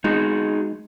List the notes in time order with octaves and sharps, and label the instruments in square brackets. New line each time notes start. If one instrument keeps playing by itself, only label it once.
[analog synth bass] G#3 [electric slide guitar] D#4 F#4 G#4